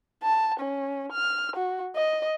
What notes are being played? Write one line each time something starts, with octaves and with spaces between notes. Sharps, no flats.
A5
C#4
F6
F#4
D#5